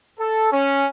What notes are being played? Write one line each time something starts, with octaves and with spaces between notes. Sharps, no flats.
A4
C#4